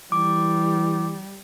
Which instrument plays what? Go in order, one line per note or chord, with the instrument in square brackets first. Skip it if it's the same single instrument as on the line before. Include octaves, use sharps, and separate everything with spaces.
[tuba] E3 [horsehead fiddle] G3 [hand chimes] D6